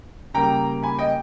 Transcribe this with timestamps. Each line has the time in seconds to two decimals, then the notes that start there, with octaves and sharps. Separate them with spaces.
0.34 C#3 G3 A#3 G5 A#5
0.83 G#5 B5
0.99 D#5 G5